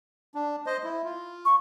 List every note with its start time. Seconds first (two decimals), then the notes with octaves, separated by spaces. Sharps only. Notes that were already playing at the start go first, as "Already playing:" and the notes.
0.35 D4
0.66 C5 D#5
0.84 E4
1.04 F4
1.45 C#6